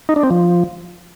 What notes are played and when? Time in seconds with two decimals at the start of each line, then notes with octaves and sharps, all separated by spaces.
0.09 D#4
0.16 D4
0.23 C4
0.31 F3